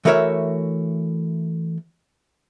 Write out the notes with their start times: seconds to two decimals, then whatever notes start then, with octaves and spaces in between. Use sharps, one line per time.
0.05 E3 A3 F#4 A#4 C#5 E5